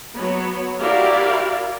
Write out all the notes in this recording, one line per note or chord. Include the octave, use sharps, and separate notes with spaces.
F#3 B3 C#5
E4 F#4 G4 A#4 D5 F5